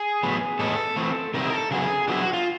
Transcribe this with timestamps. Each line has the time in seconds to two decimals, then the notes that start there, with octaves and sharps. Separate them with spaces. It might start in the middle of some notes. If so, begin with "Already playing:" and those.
Already playing: G#4
0.23 A2 F#3 B3
0.59 A2 E3 G#3 B3 A4
0.96 E3 A3 C4
1.34 C3 D#3 G3 C4 E4 A#4
1.52 A4
1.71 C#3 F#3 B3 E4 G#4
2.08 D3 F#3 B3 E4 G4
2.21 F#4
2.33 F4